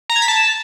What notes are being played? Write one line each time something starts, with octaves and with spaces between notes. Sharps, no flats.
A#5
G#6
B6
A5